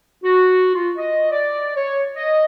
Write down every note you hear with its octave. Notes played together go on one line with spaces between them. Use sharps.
F#4
F4
D#5
D5
C#5
D#5